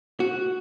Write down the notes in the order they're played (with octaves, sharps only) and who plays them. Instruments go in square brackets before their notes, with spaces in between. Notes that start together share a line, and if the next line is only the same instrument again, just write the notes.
[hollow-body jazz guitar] F#4